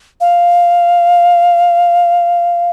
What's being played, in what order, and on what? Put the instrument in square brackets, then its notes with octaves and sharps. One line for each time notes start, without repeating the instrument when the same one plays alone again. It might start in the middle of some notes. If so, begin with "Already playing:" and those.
[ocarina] F5